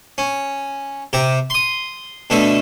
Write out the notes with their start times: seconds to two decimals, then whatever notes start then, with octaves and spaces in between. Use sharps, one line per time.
0.18 C#4
1.13 C3 G4 A#5
1.50 C6 D#6
2.30 B2 D3 A3 A4 E5